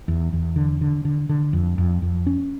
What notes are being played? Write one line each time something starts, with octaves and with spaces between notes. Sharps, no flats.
E2
E2
D3
D3
D3
D3
F2
F2
F2
C#4